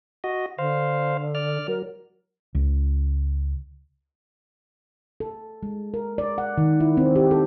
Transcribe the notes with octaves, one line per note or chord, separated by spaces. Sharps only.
F#4 D#5
D3 C5 F5
D5 F6
F#3 A#4
C#2
A4
G#3
A#4
D5
F#5
D#3
E4
C4
G4
A4